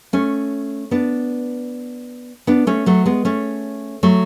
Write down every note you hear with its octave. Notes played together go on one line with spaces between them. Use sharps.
A3 C#4
B3 D4
B3 D4
A3 C#4
F#3 A3
G#3 B3
A3 C#4
F#3 A3